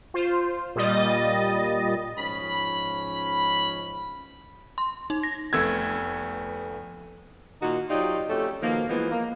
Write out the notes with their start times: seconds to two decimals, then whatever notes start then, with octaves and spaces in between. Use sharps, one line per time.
0.14 F4 C5
0.76 A#2 G3 D#5 A6
2.17 G#2 F3 C#4 B5
4.78 C6
5.10 D#4
5.23 A#6
5.53 F1 A3 B3 E6 G#6
7.61 A#2 D#3 D#4 F#4
7.90 F#3 D#4 F4 G4 D5
8.29 F2 A3 C#4 G4 A4
8.62 B2 D#3 F3 A#3
8.89 E3 F3 G#3 A#3 B3
9.11 A#3